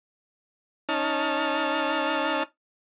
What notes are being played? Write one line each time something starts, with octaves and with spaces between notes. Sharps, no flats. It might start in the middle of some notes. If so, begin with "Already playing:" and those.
C#4 D#4 A5 F6